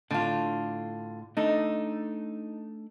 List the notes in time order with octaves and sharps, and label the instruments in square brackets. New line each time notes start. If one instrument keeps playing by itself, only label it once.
[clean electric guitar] A2 A5 [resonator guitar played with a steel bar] D3 F4
[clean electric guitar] A3 D4 A4 [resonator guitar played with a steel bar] D#4